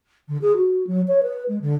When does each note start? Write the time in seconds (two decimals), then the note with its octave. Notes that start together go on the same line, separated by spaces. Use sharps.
0.28 D3
0.42 G#4
0.56 F#4
0.87 F#3
1.08 C#5
1.23 B4
1.49 G#3
1.62 D3